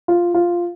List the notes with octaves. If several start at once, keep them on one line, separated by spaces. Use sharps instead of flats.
F4
F4